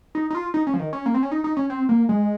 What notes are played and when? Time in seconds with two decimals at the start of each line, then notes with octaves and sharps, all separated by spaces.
0.15 D#4
0.30 D#4
0.35 F4
0.54 D#4
0.67 C#4
0.73 F3
0.80 D#3
0.93 C#4
1.06 A#3
1.14 C4
1.23 C#4
1.32 D#4
1.44 D#4
1.57 C#4
1.70 C4
1.89 A#3
2.09 G#3